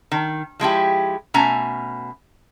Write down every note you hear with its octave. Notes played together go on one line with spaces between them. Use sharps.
D#3
F3 G#3 E4 G4
B2 A3 C#4 G#5 A#5